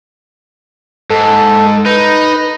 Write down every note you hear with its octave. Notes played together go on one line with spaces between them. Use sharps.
G#2 A4
D#4 B4